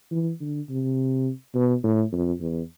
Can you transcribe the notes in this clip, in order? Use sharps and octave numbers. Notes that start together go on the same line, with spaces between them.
E3
D3
C3
B2
A2
F2
E2